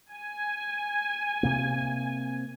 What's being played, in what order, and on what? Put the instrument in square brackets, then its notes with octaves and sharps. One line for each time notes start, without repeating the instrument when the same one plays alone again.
[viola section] G#5
[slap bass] C3 A#3